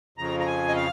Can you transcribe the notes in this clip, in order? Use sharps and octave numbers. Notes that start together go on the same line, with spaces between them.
F2 C#3 F3 A#5
A#5
G#5
D#5
F5